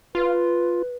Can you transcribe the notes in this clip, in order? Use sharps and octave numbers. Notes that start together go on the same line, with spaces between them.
F4 B4